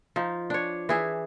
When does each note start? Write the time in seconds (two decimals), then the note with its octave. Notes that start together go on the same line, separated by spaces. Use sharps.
0.16 F3 D#4
0.50 D4 C#5
0.89 E3 G#4 E5